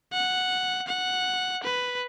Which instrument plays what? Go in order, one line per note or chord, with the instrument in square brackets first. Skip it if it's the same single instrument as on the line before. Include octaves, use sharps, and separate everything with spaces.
[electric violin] F#5
F#5
B4